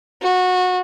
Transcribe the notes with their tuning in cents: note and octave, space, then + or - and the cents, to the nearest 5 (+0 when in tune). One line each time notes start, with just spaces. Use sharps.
F#4 -20